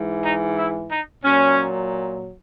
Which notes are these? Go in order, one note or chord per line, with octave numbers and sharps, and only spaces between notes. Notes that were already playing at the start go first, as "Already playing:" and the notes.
Already playing: G#2 E3
D#4
E4
D#4
A#2 F#3 C#4